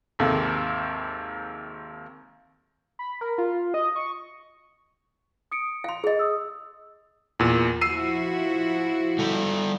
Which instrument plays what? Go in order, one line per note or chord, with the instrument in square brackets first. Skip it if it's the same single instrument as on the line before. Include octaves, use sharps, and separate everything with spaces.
[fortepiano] G#1 D#2 C3 A4
[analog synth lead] B5
A#4
F4
D#5
C#6
[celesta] D#6 C#7 D7
[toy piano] F5 C6
G#4 D#5
[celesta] D#6 E6
[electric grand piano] E2 A#2
[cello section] F3 E4 F#4 [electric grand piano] E6 C7 D#7
[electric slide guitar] G3 A4